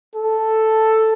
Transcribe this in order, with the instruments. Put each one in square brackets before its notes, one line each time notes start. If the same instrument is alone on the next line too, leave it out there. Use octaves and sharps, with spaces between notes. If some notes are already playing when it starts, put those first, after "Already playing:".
[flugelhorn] A4